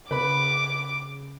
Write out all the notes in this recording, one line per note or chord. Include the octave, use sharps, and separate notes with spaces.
C#3 B4 B5 D6